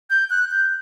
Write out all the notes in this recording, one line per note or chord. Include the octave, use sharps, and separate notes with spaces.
G6
F#6
G6